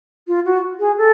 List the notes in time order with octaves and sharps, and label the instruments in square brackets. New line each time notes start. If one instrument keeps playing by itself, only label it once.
[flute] F4
F#4
G#4
A4